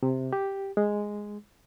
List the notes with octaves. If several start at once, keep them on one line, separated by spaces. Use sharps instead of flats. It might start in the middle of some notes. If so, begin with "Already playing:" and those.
C3
G4
G#3